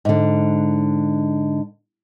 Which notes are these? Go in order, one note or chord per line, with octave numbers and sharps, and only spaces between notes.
G#2 D3